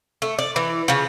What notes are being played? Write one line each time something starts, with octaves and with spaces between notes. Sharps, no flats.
A3
D5
E3
C#3 F3